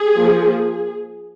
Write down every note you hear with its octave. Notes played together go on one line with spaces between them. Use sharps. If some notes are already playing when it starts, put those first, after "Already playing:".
Already playing: G#4
F3 A#3